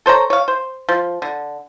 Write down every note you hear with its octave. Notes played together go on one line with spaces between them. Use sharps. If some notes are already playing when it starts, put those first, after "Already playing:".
A4 C5 C#5 A#5
C#5 F5
C5
F3
D3